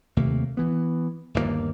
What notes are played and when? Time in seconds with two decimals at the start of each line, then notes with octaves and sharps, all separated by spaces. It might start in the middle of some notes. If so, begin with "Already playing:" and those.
0.17 D#2 C3 A3 A#3
0.57 E3 B3
1.34 G1 D#2 D3 A#3